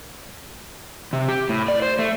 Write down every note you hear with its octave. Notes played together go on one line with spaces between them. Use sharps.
C3
G4
A2
D5
C5
A3